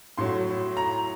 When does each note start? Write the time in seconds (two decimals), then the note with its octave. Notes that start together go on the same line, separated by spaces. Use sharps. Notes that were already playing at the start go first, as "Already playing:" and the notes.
0.18 A2 F#3 C6
0.77 A#5